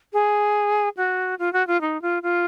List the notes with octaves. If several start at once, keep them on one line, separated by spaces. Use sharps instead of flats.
G#4
F#4
F4
F#4
F4
D#4
F4
F4